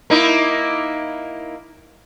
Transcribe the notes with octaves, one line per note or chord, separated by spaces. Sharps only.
A#3 D#4 E4